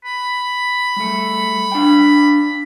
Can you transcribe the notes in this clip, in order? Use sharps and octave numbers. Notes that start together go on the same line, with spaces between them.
B5
G3 A3
D4 F5 G5